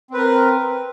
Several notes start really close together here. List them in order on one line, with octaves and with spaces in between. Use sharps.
C4 B4 A#4